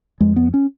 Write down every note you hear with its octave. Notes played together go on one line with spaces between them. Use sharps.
F2 G#3
B3
C#4